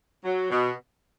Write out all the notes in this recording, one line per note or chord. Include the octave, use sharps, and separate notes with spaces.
F#3
B2